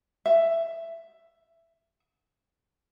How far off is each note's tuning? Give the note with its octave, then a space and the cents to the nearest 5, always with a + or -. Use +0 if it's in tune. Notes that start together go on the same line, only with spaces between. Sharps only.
E5 +10